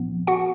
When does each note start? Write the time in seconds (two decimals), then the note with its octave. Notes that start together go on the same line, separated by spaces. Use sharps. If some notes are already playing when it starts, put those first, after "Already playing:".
Already playing: A#2 F3 B3
0.27 F#4 F#5